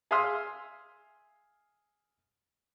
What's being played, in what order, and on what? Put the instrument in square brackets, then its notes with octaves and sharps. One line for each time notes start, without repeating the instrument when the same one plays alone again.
[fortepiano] G#4 E5 F5 C6 D#6 F6